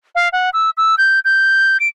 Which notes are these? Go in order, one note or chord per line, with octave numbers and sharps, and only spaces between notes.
F5
F#5
E6
E6
G6
G6
D7